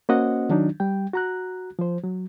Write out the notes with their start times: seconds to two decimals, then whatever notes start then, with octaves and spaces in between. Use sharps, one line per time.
0.09 A#3 C#4 F#4 C5 D#5 F#5
0.49 D#3 F#3 D4 D#4
0.80 G3 G5
1.13 F#4 A#5 F#6
1.79 F3 C5
2.04 F#3